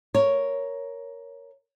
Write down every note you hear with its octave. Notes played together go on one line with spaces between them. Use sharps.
A#4 C#5